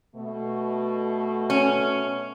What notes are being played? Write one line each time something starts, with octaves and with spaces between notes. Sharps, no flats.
B2 A3
C#4